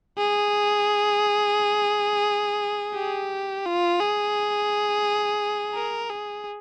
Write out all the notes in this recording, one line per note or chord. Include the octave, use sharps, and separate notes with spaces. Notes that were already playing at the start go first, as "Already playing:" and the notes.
G#4
G4
F4
G#4
A#4
G#4